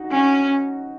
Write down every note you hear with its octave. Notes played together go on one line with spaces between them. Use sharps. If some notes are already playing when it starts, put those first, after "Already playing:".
Already playing: D#4 F#4
C#4